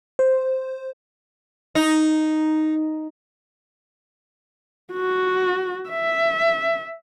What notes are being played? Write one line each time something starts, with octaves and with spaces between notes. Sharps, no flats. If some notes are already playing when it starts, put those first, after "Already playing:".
C5
D#4
F#4
E5